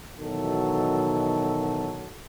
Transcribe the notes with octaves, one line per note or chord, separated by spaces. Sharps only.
B2 D#3 E3 F#3 A4